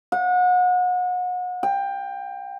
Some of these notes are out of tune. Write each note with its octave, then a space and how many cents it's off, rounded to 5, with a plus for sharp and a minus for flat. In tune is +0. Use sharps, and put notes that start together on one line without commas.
F#5 -35
G5 +15